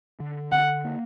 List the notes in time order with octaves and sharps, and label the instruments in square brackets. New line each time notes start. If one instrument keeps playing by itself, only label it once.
[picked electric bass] D3
[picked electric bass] D3 [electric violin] F#5
[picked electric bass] A#3